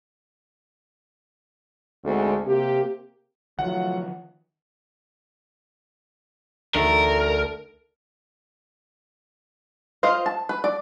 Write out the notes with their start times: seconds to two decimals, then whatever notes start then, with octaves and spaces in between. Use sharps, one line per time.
2.04 D2 G#2 G#3 C4
2.47 C3 A#3 G4
3.59 D#3 F3 F#3 A3 F4 F#5
6.75 D2 D#4 A#4 E5
10.03 F4 C5 D#5 F5
10.26 A5
10.49 B4
10.64 D5